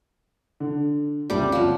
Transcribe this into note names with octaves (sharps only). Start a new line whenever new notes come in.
D3
F#1 C2 F2 G3 D6
F3 F#3